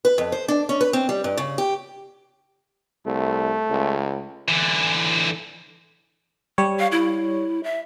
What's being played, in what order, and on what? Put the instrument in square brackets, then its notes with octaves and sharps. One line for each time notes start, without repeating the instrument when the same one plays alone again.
[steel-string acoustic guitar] B4
F2
C5
D4
C#4
B4
C4
G3
G2
C#3
G4
[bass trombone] C2 [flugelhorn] A3
[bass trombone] C#2
[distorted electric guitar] D3 E3
[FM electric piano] G3 C#5
[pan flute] F5
E4
E5